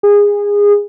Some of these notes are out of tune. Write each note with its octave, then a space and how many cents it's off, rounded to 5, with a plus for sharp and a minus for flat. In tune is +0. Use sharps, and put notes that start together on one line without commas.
G#4 -20